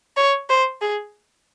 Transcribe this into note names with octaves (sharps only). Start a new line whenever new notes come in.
C#5
C5
G#4